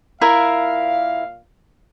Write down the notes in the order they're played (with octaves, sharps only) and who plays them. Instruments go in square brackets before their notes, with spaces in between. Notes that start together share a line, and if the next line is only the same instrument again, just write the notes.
[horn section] A#2 F5 [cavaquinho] E4 A#4 E5